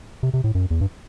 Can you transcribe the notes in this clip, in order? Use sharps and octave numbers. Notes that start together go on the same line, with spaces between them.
C3
C3
A2
F#2
E2
G2